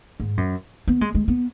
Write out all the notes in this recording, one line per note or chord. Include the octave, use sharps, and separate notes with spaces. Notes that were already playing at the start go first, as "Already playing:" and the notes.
G#2
F#2
B3
G#3
G#3
B3